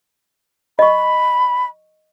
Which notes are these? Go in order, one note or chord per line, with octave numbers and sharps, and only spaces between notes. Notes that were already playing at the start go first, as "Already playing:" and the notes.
D#5 B5 C#6